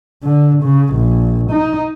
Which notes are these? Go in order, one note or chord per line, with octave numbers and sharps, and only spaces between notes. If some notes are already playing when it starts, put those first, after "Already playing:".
D3
C#3
A#1
D#4